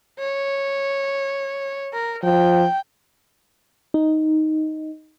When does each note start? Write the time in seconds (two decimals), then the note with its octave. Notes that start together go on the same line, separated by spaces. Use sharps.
0.19 C#5
1.93 A#4
2.23 F3 G5
3.94 D#4